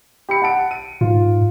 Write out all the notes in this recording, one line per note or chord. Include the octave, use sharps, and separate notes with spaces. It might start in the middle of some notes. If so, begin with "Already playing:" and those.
G4 B5 C#7
F#5 A5 D7
D#7
G#2 F4